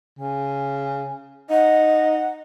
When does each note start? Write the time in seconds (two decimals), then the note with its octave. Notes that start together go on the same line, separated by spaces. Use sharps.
0.19 C#3 G#5
1.50 D#4 D#5 F#5